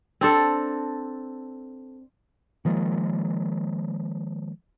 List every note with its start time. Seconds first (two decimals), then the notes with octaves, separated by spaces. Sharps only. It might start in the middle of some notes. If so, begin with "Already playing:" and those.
0.21 C4 D4 A4
2.65 D#3 F3 G#3 A#3